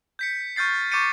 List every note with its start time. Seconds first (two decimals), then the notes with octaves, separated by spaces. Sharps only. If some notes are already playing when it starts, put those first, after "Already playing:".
0.19 G6 B6 C#7
0.56 C#6 F6 G6 A6 C7
0.92 C#6 D6 G6 A6 C#7 D#7